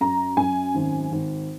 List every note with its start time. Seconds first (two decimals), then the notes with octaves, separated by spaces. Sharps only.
0.01 F#2 A#5
0.37 F#2 G#5
0.75 G#1
1.12 G#1